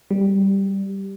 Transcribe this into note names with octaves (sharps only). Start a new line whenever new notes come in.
G3